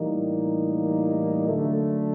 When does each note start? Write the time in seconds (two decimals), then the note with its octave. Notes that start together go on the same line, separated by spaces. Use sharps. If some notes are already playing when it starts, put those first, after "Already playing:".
Already playing: A2 E3 G3 A#3 D#4
1.45 D3 F#3 A3